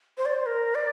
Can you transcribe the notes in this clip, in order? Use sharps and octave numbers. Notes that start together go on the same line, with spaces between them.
C5
D5
C5
A#4
D5